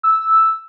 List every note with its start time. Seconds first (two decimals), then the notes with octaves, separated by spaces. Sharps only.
0.03 E6